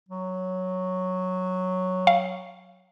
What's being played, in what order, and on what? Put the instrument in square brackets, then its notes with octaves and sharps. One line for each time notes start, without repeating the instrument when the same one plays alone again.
[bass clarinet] F#3
[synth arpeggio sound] F5